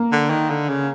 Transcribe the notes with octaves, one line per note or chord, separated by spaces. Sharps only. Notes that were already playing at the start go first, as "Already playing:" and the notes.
Already playing: A#3
D3
D#3
D3
C#3